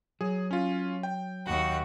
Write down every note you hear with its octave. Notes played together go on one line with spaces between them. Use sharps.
F#3 G#4
C#4 F4
G5
D#2 F#4